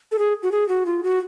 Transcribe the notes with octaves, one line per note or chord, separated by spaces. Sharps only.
A4
G#4
F#4
G#4
F#4
F4
F#4